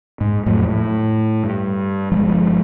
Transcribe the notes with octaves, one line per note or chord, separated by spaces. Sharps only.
G#2
F2 A2 F#3
A2
G2
G1 F3 G#3